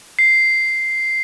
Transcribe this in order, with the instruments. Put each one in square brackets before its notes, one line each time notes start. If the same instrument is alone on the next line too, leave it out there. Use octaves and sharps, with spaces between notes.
[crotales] C7